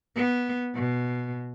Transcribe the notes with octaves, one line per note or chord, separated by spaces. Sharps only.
B3
B2